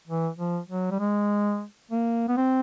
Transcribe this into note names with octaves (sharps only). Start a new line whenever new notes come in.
E3
F3
F#3
G3
G#3
A#3
B3
C4